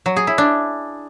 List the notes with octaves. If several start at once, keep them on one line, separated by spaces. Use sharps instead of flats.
F#3
G#4
E4
D4